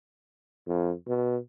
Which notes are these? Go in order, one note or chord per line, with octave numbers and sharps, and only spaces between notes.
F2
B2